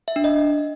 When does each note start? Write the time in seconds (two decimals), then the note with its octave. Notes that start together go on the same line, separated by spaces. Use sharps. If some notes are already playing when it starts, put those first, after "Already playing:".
0.08 E5
0.16 D4
0.24 D#5